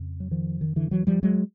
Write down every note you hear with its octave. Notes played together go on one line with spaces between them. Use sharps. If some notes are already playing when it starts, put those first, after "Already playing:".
Already playing: F2 C#3
F#3
D#3 F3
D#3
D3 E3
E3 F#3
F3 G3
F#3 G#3